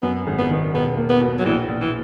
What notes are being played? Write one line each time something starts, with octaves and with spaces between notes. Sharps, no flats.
F#2 B3
G#1
B3
D#3
E1 B3
A#3
B3
B2
F#3
A#1 E3
A#1
E3